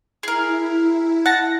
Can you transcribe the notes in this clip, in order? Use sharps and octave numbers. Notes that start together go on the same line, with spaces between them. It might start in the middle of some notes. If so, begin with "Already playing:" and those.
E4 G#4 A#4
F#5 A5 A#6